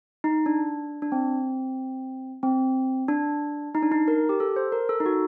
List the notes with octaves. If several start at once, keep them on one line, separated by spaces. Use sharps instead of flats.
D#4
D4
D4
C4
C4
D4
D#4
D4
D#4
A#4
G4
A4
C5
A#4
A4
D#4
F#4